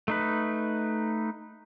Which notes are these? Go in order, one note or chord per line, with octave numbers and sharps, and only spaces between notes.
A3 D#4 B4